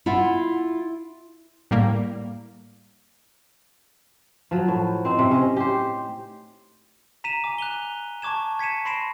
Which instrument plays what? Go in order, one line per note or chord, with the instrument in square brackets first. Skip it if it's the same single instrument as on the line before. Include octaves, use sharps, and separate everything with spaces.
[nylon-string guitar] E4 F4 E5 F#5
[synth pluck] A2 G3 A#3
[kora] F3 F#3
A2
C4 D#4 C5
C3
C#4 D#5
G4 C5
[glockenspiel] A#5 B6 D#7 E7
G#5 D6
F#6 F7 G7
A5 C#6 D6 G#6 E7
G#6 B6 C#7 D#7 E7
B5 C6 A#6 C7 D7 E7